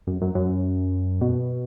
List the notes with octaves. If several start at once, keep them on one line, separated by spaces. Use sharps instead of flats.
F#2
F#2
F#2
B2